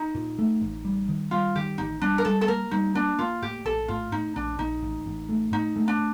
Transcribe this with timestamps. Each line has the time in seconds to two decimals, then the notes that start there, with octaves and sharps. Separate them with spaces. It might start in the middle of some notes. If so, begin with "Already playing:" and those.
Already playing: D#4
0.15 A#2
0.39 A3
0.61 A1
0.85 G3
1.09 D#3
1.31 G3 F4
1.56 D#3 G4
1.78 A1 D#4
2.02 G3 D4
2.18 A#4
2.25 G3 A4
2.41 A4
2.48 A#3 A#4
2.71 G3 D#4
2.95 A#3 D4
3.19 A#3 F4
3.42 A2 G4
3.65 A#1 A4
3.88 A2 F4
4.12 A2 D#4
4.36 A#1 D4
4.59 A#1 D#4
4.82 A1
5.06 A1
5.29 A3
5.52 A2 D#4
5.76 A3
5.88 D4